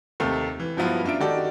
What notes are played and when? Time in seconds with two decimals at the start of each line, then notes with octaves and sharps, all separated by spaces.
0.20 D#2 C3 A3
0.60 E3
0.77 G2 F3 F#3 B3 E4 F4
1.04 F#2 D4 F4 E5 D7
1.20 D#3 F#4 G4 A4 D5